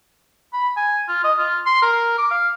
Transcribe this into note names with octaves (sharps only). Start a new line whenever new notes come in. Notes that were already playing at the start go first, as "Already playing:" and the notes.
B5
G#5
F4
D#5
F4
C6
A#4
D6
F5